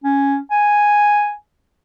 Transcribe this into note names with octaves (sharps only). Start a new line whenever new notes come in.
C#4
G#5